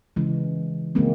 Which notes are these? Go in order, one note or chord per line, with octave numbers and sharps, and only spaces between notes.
C#3 E3 G#3
C#3 E3 G#3 A#3 C4